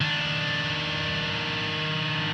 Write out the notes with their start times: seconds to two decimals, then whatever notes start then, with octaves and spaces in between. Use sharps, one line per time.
0.01 D#3 D4